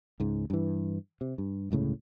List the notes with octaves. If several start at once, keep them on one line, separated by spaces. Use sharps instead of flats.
C#2 G#2
G2 E3
C3
G2
G1 C#2 A2 C#3